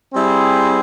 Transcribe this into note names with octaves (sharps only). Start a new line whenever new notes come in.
G3 C4 E4 G#4